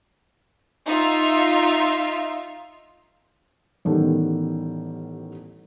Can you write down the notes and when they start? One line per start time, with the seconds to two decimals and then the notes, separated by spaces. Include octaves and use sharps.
0.87 D#4 F4 E5
3.85 A1 D#3 G3 B3 A4